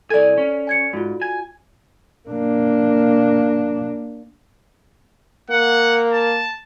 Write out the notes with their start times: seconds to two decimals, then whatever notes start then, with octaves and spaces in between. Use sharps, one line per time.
0.10 C2 A4 D5 G#5
0.38 C#4
0.67 G#5 G#6 C#7
0.93 G#2 F4 F#4
1.22 G#5
2.29 A#3 D4
5.50 A#3 F#5
6.12 A5